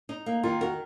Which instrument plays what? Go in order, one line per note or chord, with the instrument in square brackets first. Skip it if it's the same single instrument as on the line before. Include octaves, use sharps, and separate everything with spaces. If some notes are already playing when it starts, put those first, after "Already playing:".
[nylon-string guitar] D#4
A#3
[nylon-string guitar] D#3 [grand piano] F4
[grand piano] F#4 [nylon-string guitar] A#4